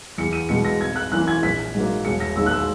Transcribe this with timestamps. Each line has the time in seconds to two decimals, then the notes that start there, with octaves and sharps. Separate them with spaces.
0.18 E2 C#7
0.33 D#7
0.49 B2 G#3 C#7
0.65 A#6
0.80 G#1 G#6
0.96 F#6
1.12 F#2 E3 A#3 F#6
1.28 G#6
1.42 A#1 B6
1.75 G#2 F#3 A#3
2.05 E1 C#7
2.20 A#6
2.36 D#2 D#3 G#3 E6
2.46 F#6
2.51 E6